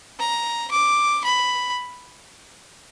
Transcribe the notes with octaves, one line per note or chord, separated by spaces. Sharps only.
A#5
D6
B5